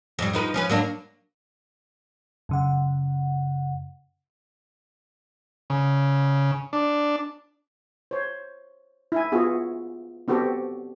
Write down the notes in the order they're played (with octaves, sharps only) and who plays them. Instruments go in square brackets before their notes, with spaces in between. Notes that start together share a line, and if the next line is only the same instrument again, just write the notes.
[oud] F2 G3
F3 D#4 B4
F3 C#4 B4
F#3 A#3 D4
[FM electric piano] F#2 C#3 F#5
[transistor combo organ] C#3
D4
[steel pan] C5 C#5
E4 G#5
B3 F4 F#4 G#4
B3 C4 F#4 G4 A4